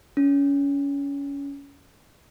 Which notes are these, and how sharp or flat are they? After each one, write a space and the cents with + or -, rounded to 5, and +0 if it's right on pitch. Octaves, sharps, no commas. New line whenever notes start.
C#4 +25